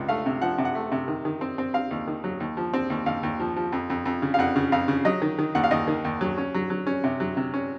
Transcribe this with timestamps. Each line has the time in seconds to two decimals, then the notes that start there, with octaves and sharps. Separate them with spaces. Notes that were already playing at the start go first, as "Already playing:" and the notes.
Already playing: C#2 C3
0.08 A3 F5
0.26 C3
0.42 F3 F#5
0.58 C3
0.65 F#5
0.75 A3
0.92 C3
1.08 D#3
1.25 D#3
1.41 C4
1.58 C4
1.74 C4 F5
1.91 D#2
2.08 D#3
2.24 F#3
2.40 D#2
2.57 F3
2.73 C4
2.90 D#2
3.06 D#2 F5
3.23 D#2
3.40 F3
3.56 F3
3.72 F2
3.90 F2
4.05 F2
4.22 C#3
4.34 F5
4.39 F2 F#5
4.56 C#3
4.72 F2 F5
4.88 C#3
5.05 F#3 D#5
5.22 D#3
5.39 D#3
5.55 D#2 F#5
5.64 F5
5.71 D#2 D#5
5.88 D#3
6.05 D#2
6.21 F#3
6.38 C#4
6.54 F#3
6.70 F#3
6.87 C#4
7.04 C3
7.20 F#3
7.37 C3
7.54 C#4